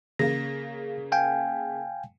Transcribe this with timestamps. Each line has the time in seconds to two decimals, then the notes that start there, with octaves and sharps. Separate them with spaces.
0.19 C#3 A#3 A#6
1.12 F5 G5 G#5